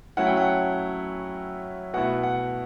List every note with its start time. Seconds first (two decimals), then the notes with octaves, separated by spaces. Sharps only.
0.17 F#3 A3 C#4 E4 F#5
0.27 G5
0.37 F#5
1.93 B2 A3 E4 F#5
2.23 F#5